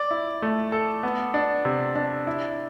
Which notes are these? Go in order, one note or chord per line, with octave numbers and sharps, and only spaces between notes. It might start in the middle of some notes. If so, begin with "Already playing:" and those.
Already playing: D5
E4
A3
A4
B3
D4
C3
D4
E4